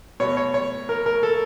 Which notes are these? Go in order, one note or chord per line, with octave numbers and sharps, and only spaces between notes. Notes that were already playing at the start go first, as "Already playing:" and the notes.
B2 C#5
C#5
C#5
A#4
A#4
A4